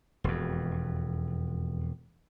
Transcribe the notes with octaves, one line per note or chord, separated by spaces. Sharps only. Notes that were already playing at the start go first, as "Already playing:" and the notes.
E1 F2